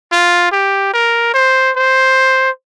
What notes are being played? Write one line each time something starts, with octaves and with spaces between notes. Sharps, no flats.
F4
G4
A#4
C5
C5